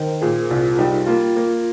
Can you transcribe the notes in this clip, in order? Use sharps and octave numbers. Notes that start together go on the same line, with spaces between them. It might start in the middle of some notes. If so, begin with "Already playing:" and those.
Already playing: D#3 A#4 C5
A#2 G#4
C2 F4
G3 D#4
A#3 F4
A#3